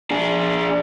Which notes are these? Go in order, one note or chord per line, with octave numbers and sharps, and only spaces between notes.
D4 G#4